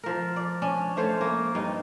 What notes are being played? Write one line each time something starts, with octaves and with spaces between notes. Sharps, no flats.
F3 A#4
D5
C#4 D4
A3 C5 C#5 F5
A#3
G2 D#4